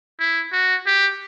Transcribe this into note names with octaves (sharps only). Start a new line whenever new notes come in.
E4
F#4
G4